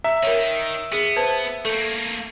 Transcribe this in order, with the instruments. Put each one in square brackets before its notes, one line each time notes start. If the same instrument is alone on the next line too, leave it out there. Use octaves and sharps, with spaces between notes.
[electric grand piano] E5 [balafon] A#5
[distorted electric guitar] D#3 [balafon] A#4 C#5
[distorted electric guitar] B3 [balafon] G#4
[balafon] B4 C5 A5
[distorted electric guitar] A3 A#3 [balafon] A4